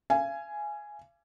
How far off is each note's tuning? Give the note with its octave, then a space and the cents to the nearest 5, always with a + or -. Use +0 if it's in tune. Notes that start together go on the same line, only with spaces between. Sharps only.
F5 -40 G#5 +5